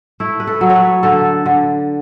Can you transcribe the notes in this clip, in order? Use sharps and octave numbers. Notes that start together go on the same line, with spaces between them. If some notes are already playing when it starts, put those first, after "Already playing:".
A3 E4
B4
A4
F#3
C#5
B4
D3 A4
D3